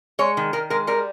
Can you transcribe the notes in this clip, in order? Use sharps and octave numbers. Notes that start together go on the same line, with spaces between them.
G#3 C#5
D#3
D#3 A#4
G#3 A#4
G3 A#4